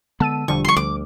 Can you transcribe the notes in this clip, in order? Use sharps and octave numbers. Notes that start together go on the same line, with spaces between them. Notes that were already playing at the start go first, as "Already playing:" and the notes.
D3 G#3 B3 A5 E6 D#7
E1 D3 F3 G3 C#6
C6 C#6
D2 D6